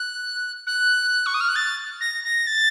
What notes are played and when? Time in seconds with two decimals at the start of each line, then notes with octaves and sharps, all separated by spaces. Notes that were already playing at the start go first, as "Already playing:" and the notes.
Already playing: F#6
0.67 F#6
1.26 C#6
1.34 D#6
1.41 F6
1.49 F#6
1.56 A6
2.01 A#6
2.24 A#6
2.47 A6